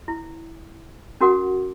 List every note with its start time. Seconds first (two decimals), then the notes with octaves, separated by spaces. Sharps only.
0.08 E4
1.21 C#4 F#4 A#4 F#5 D6